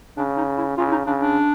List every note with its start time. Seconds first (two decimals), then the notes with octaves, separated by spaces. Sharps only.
0.17 C#3 D4
0.37 D#4
0.58 E4
0.77 C#3 F4
0.88 E4
0.92 D#4
1.07 C#3 D4
1.21 D4